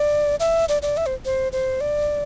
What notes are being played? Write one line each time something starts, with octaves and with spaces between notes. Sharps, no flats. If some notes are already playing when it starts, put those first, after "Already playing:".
Already playing: D5
E5
D5
D5
E5
C5
C5
C5
D5